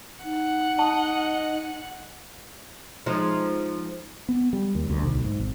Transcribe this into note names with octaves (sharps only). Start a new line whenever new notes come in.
D#4 F#5
D#5 A5
F3 G#3 D#4
B3
G3
D#2
D2
B1
G#2
G#1